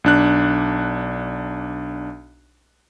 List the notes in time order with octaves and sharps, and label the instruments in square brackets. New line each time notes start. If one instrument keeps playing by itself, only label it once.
[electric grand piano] B1 D4 F#6